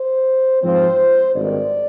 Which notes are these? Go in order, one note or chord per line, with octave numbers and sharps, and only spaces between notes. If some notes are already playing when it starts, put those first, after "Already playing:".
Already playing: C5
G#2 F3 C4 F4 C5
G#1 G2 D#3 D5